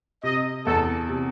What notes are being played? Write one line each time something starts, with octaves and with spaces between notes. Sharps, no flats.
C3 D#5
E2 A4
C3